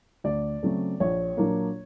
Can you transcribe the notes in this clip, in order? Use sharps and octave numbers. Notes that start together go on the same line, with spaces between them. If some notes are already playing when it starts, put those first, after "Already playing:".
D2 D5
C#3 F#3 A3 C4
A#1 C#5
A#2 F#3 A#3 D4